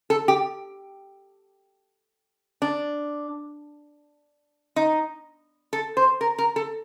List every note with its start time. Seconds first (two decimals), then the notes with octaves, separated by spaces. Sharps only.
0.10 A4
0.28 G4
2.62 D4
4.76 D#4
5.73 A4
5.97 C5
6.21 A#4
6.38 A#4
6.56 A4